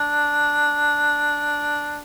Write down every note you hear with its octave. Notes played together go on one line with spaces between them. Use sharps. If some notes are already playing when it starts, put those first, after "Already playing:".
Already playing: D4